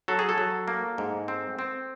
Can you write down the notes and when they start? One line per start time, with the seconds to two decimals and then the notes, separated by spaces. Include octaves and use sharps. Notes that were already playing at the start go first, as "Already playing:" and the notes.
0.08 F#3 A4
0.19 G#4
0.29 A4
0.38 F#3
0.68 A#3
0.98 G#2
1.28 C4
1.59 C4